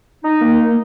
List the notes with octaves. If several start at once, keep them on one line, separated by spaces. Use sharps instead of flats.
D#4
A#3